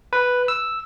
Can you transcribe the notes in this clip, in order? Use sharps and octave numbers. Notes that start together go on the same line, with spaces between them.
B4
E6